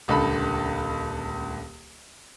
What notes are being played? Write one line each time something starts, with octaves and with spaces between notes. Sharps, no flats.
D#1 C#2 D3 A4 B5